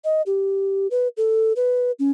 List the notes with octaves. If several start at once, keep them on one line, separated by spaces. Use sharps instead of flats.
D#5
G4
B4
A4
B4
C#4